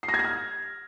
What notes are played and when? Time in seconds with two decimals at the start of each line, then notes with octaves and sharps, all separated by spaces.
0.03 C7
0.08 A#6
0.14 G#6
0.19 A#6
0.25 F6